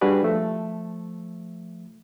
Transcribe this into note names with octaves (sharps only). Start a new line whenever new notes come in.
G3 D4 F#4 G#4 B4 D5
F3 A3